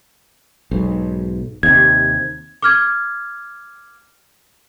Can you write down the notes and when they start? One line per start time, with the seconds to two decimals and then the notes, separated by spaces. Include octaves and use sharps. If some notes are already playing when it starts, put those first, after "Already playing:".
0.71 B1 G#2
1.63 D#2 C3 G#6
2.62 D6 F6 G#6